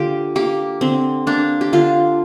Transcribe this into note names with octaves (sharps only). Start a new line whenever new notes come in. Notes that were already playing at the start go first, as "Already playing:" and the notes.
Already playing: D3 A#3 F4 G4
A#3 G4
D3 C4
A#3 D4
G4
D3 F4